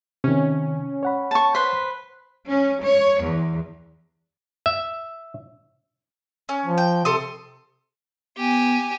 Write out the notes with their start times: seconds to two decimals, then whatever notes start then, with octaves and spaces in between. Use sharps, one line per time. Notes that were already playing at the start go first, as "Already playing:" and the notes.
0.24 C3 D#3 C#4
1.03 C#5 F#5 B5
1.31 A5 C#6
1.55 B4 C5 B6
2.48 C#4
2.83 C#5
3.21 E2
4.66 E5
6.49 C#4
6.66 F3
6.78 G5
7.05 C3 A4 C6 D#6
8.37 B3 G4 G#5